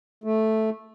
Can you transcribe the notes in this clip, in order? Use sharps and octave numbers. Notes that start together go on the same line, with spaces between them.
A3